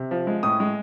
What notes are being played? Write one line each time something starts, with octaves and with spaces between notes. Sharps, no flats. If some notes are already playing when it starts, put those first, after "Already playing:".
Already playing: C3
F3
G#3
A2 D#6
G#3